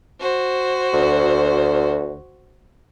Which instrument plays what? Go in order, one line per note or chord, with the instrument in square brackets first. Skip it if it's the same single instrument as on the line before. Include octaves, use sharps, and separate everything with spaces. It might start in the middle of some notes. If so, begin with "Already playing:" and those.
[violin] F#4 C5
[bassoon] D2